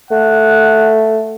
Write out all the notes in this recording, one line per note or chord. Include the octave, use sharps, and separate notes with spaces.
A3 F#5